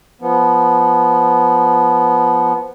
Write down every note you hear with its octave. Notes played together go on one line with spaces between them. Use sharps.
F3 B3